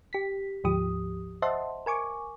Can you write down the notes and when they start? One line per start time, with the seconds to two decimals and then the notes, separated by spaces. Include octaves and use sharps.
0.13 G4 B6
0.64 D2 G#2 F3 G4 D#6
1.42 C5 D#5 E5 F#5 A5 C6
1.86 A#4 G#5 C#6 D6